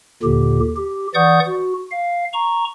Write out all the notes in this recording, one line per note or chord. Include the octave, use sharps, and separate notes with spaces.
D#2 A#2 D3 G4
G4
E3 D5 F#5 C#6 D#6 G6
F#4
F5
A#5 C#6